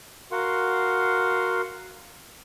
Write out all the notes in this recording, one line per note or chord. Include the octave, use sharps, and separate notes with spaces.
F#4 A#4 F5 F#5 C6